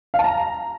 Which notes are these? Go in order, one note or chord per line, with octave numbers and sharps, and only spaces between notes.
F5
A5
A#5